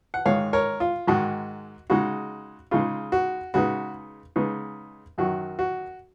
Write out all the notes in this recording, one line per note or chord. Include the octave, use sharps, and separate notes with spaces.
F#5
G#2 D#3 G#3 C#5 F5
A#4 C#5
F4
G#2 D#3 G#3 F#4
C#3 G#3 D#4 F#4
C#3 G#3 D#4 F4
F#4
C#3 G#3 B3 D#4 F#4
C#3 G#3 B3 D#4
F#2 D#3 F#3 F#4
F#4